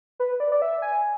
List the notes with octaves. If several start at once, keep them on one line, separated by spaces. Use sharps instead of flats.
B4
D5
D5
E5
G#5